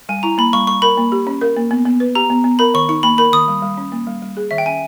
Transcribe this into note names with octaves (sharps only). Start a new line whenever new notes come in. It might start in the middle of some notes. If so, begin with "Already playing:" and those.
G3 G#5
E4 A#5
A#3 B5
G3 C#6
G3 C#6
A#4 B5
A#3
G4
C#4
A#4
A#3
B3
B3
B4
G4 A#5
B3
B3
A#4 B5
D#3 C#6
D#4 C#6
A#3 B5
A#4 B5
D#3 D#6
G3
G3
C#4
A#3
G3
G3
G#4
D#3 E5
G5
C#4 G#5